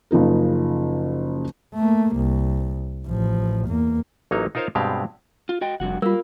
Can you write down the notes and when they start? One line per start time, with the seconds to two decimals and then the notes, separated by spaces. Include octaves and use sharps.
0.11 F#1 C#3 F3 D#4 A#4
1.74 A3 A#3
2.16 C2
3.06 A1 F3
3.67 E2 A#3
4.31 A1 F#3 A#3 D#4 C#5
4.55 D#4 F4 A#4 C5 C#5 F5
4.75 G2 B2 G#3 C4 G4 F5
5.49 F4
5.61 F#4 D#5 G5
5.80 F1 G2 F#4 F#5
6.02 G3 A#3 F4 A#4